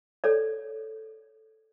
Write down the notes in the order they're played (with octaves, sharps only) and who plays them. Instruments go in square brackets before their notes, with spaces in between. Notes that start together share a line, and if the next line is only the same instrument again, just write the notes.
[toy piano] A4 C#5 D5